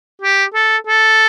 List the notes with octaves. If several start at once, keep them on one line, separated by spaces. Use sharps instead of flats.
G4
A4
A4